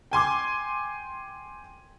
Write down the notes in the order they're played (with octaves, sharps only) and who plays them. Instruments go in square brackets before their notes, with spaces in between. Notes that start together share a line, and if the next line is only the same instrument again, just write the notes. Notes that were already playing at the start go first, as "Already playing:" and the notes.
[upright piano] G5 G#5 C6 D6